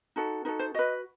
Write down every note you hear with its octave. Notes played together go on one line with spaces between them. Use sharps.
D#4 F#4 A4
D#4 F#4 A4 B4
C5
F#4 B4 D#5